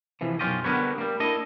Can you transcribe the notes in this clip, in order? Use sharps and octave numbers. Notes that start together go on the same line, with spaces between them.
C3 E3 F3
B1 F#2 C#4 F4 G4 D#5
D3 G3 B3 A#4 B4 C#5
G3 A#3
A#3 D4 E4 A4 D#5